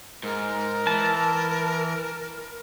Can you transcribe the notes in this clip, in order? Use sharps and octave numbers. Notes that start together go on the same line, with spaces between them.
G#2 A#4
E3 A5